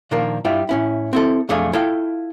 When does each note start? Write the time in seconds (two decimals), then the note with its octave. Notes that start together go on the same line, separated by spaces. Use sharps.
0.11 A#2 D#3 F3 A#3 D4 A#4
0.45 G2 G3 E4 F4 E5 G5
0.69 A2 C#4 E4
1.13 C4 E4 A4
1.49 B1 F2 A3 D4 G#4 F5
1.73 E4 F4 A4 F5 G5